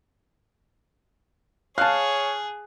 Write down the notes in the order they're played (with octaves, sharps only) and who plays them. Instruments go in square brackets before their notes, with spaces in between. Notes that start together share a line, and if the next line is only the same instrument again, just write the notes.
[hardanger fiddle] G#4 [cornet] C#5 [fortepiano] F5 [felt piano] A5 F#6